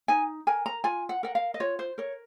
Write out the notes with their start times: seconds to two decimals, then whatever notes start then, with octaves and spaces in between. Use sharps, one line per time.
0.08 D#4 G#5
0.47 A#4 G#5
0.66 A#5
0.84 F4 G#5
1.09 F#5
1.23 A#4 F#5
1.35 F5
1.54 D#5
1.60 F4 C#5
1.79 C5
1.98 A#4 C#5